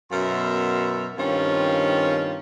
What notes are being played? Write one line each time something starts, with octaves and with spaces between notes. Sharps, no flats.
F#2 B2 B3 A#4 E5 C6
G2 D#3 C4 C#4 F4